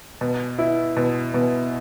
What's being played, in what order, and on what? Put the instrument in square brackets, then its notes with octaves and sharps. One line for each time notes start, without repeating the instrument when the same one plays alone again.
[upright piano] B2
E4
B2
B2